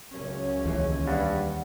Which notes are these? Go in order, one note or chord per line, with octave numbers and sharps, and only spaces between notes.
C#2 F#2 C#4
D#2 E3 G#3
G2 F#5